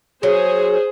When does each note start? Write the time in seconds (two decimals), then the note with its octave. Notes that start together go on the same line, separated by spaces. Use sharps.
0.23 F#3 G#4 C5